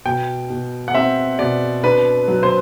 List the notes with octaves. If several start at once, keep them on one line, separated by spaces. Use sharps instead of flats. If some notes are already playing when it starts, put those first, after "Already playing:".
B2 G5
B2
F#5
C4 E5
B2 D5
D4 B4
F#3
C5